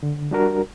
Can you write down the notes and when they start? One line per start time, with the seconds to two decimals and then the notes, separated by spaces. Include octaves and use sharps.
0.03 D3
0.31 G3 D4 F#4 A#4